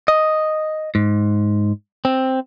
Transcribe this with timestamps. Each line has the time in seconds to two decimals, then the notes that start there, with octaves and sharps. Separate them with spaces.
0.08 D#5
0.95 G#2
2.05 C4